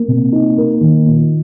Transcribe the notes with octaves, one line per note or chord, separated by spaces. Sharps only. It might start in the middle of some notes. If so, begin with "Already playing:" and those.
Already playing: A#3
C3
D#4
A#3
D#3
A#2